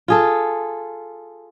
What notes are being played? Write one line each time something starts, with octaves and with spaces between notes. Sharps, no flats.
F4 G#4 A4